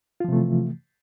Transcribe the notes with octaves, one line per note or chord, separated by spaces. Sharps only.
C3 E3 F3 A3 F4